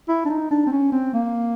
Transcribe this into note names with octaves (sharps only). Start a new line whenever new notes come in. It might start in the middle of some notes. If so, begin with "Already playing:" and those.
E4
D4
D#4
D4
C4
C#4
C4
A#3